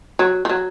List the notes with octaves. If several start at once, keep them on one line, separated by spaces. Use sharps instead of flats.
F#3
F3
F#3